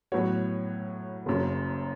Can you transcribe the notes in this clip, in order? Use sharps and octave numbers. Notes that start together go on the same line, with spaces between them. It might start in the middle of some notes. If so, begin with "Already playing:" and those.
A2 F#3 B3 F#4 C#5
F#1 F#2 C#3